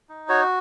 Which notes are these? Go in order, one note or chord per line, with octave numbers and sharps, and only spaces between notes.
D#4
F#4 C#5